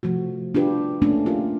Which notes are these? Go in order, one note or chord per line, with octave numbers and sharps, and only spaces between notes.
C3 F3 A3 F#4
D4 F4 G4 B4
A3 A#3 C#4 D4
F4 G4 A#4